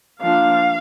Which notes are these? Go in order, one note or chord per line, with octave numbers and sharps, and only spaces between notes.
F3 A#3 D4 F5